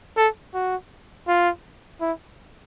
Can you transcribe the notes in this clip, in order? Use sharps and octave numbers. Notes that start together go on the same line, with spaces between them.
A4
F#4
F4
E4